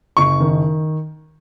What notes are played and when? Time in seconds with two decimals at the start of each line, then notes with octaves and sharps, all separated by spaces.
0.17 F#1 C#6
0.40 D#3